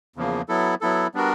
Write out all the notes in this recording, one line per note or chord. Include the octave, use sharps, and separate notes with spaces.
E2 C#3 F3 A#3
F#3 B3 E4 A4
F#3 B3 E4 A4
G3 B3 D4 F#4 A#4